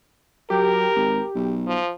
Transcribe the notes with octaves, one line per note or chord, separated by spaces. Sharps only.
F#3 G4 A#4
G#1
B1
F3